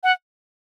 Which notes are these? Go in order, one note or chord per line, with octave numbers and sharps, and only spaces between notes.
F#5